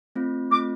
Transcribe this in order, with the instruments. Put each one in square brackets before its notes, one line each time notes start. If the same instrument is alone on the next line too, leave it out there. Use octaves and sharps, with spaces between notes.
[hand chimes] A3 C4 F4
[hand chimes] A3 C4 F4 [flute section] D6